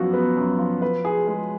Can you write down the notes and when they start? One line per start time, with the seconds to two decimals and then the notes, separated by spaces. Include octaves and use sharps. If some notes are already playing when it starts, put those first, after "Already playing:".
Already playing: F#2 F3 B3 F#4
0.13 B3
0.37 F#2
0.59 F3
0.82 B4
1.05 G#4
1.27 G#3